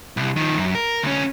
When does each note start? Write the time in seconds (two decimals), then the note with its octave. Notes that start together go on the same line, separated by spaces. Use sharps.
0.17 C2
0.36 D#3 F3
0.57 F#2
0.75 A#4
1.03 D2 C#4